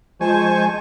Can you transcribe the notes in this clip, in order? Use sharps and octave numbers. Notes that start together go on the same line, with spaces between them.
F3 G#3 C5 G#5 A5 C#6